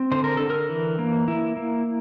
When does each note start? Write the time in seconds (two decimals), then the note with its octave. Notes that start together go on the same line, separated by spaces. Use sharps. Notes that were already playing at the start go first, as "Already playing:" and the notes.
Already playing: C4
0.11 D3 C5
0.24 A#4
0.37 D3 A4
0.50 A#4
0.69 E3
0.99 A#3
1.28 A#3 E4
1.57 A#3